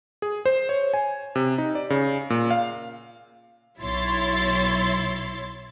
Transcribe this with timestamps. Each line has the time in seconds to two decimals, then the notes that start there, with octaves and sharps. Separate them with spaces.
0.22 G#4
0.45 C5
0.69 C#5
0.94 G#5
1.35 C3
1.58 D#4
1.75 D5
1.90 C#3
2.30 A#2
2.51 F5
3.80 B1 E4 C#5 C6 A6